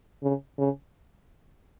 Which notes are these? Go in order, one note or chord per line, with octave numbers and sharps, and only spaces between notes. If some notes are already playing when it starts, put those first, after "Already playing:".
C#3
C#3